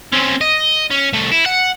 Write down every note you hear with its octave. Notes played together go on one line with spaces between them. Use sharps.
C4 C#4
D#5
C#4
C2 A3
E4
F#5